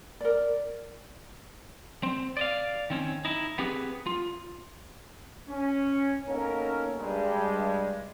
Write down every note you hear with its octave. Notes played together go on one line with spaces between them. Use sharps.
A#4 D5
C4
D5 D#5 F5
D#3 C4 C#4
D#4 E4
B3 C4 G4 G#4 B4
F4
C#4
A#3 B3 C#4 D#4 A4 A#4
G2 G3 G#3